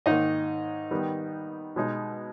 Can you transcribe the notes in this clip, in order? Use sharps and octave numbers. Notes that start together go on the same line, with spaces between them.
G#2 D#3 A#3 D#4 D#5
D#3 G3 B3
B2 G#3 D#4